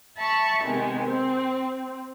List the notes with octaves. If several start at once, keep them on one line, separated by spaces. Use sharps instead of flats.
E5 A5 B5 C#6
C3 D#3 G#3 B3
C4